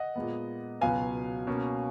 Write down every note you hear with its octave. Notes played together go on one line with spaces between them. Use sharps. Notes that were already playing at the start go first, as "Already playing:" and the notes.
Already playing: D#5 F#5
A#2 G#3 B3
C#2 B2 F#3 B3 F5 G#5
B2 A#3 C#4